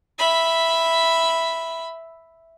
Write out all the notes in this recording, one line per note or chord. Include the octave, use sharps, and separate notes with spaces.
E5 B5